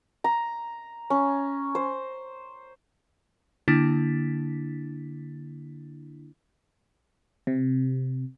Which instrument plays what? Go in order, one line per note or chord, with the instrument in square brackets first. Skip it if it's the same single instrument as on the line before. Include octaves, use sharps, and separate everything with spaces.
[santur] A#5
C#4
C5
[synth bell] D3 A#3 D4 E4 A6 B6
[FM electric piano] C3